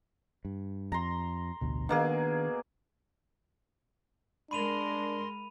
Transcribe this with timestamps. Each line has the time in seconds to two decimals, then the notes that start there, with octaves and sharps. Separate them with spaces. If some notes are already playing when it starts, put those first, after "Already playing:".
0.45 G2
0.92 F2 A#5 C6
1.61 A1 D2 B2
1.89 B2 D#3 A#3 D4 G#4
4.51 G#3 D4 A#4 B5 C6 D#7 F7